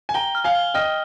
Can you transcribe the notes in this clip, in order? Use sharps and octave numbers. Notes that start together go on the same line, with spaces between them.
G#5
G5 A#5 G7
F6
F5 G#5
G7
D#5 G5 F6